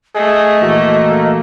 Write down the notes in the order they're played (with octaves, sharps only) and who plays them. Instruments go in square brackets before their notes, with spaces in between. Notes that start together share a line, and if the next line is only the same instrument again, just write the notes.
[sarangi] A3 [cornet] G#4 [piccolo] D#5
[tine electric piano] A#1 E3 F#4 [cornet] A#3